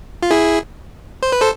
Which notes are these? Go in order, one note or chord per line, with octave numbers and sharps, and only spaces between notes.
F4
E4 G#4
C5
B4
A4 C5